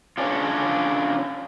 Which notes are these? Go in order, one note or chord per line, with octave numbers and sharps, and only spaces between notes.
C#4 D4 F4